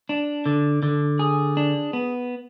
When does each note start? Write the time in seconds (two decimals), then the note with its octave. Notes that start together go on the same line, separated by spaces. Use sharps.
0.09 D4
0.46 D3
0.83 D3
1.19 G#4
1.57 D4
1.93 B3